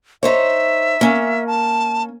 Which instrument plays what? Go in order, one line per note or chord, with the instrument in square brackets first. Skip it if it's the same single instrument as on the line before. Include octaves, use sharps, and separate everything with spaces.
[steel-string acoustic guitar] D#4 C5 C#5 [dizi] E5
[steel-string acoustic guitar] A#3 C#4
[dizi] A5